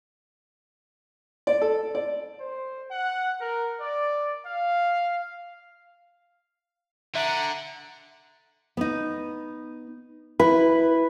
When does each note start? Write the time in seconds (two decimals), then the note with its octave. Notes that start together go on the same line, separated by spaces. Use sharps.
1.47 D5
1.62 A4
1.95 D5
2.40 C5
2.91 F#5
3.40 A#4
3.80 D5
4.44 F5
7.15 D3 E5 F#5 A#5
8.77 B3 D#4
10.39 E4 B4